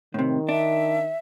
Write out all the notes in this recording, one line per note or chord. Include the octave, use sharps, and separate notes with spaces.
A2 C3 D#3
D4 E5